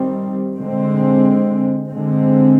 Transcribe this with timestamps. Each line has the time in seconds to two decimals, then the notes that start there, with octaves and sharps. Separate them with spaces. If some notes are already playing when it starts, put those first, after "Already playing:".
Already playing: D#3 G3 C4
0.59 D3 G#3 C4
1.88 D3 G#3 C4